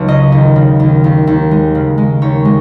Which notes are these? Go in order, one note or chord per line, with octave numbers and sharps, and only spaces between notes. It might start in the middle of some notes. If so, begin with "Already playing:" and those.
Already playing: C#2 F#3 D#4 C#5
C#3 D#5
D#2
C#3
D#2
D#2
D#2
G#3
C#3
G#3
D#2 C#5
G#3